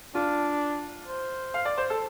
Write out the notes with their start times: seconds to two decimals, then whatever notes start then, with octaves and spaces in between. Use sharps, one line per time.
0.15 D4 F4
1.08 C5
1.54 F5
1.65 D5
1.78 C5
1.90 A4